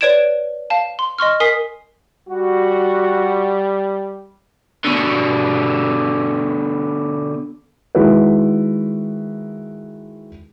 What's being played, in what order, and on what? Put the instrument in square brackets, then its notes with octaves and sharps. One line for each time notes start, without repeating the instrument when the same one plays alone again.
[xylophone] B4 C#5 D5 G#6 D7 E7
F5 A5
C6
D#5 C6 C#6 F6
A#4 G#5 D#6 B6 C7
[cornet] G3 [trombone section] F#4
[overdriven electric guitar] B2 D3
[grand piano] D#3 G#3 E4 F#4 B4